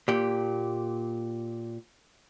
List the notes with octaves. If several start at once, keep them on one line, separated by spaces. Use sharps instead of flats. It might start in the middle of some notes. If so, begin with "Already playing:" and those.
A#2 G4